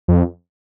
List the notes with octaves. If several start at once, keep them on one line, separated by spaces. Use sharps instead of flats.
F2